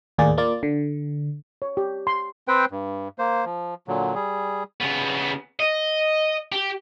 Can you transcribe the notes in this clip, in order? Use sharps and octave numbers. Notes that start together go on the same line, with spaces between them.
D#2 A2 A#3 G#4 D5
A#3 F4 D5
D3
C#5
G4
C6
C4 B4 C5 G5
G2
A#3 C5
F3
A#2 D3 F#3
G3 G#4
C#3 B3
D#5
G4